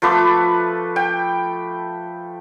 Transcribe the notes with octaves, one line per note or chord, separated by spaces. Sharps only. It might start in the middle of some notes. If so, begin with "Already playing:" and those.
F3 A3 B4 D6
G5